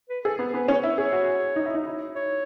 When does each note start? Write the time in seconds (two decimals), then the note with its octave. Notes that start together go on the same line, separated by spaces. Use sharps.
0.10 B4
0.25 G#4 A4
0.39 B3
0.54 B3 B4
0.68 C#4 C#5
0.83 E4
0.98 G#4 C#5
1.13 F#4
1.56 D#4
1.66 E4
1.75 D#4
1.86 E4
2.15 C#5